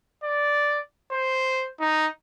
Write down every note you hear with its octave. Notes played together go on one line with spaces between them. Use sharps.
D5
C5
D#4